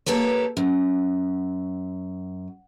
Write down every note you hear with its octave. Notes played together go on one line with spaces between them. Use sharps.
A#3 G4 A4 B4 C#5
F#2